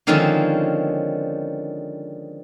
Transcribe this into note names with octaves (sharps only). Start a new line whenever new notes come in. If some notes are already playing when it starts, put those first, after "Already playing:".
D3 D#3 F3 G#3 C4 C#4